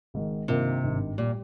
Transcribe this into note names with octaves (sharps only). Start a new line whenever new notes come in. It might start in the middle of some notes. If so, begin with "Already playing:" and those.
G#1 G#2 D#3
G2 C3 D#3 A#3 F4 A#4
G#1 G2 D#3
A#2 G3